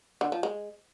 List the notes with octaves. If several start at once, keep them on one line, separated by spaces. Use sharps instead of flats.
D3
F3
G#3